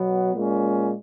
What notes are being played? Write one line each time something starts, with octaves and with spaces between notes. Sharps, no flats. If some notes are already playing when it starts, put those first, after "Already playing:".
Already playing: B2 F#3 B3
A#2 G#3 C#4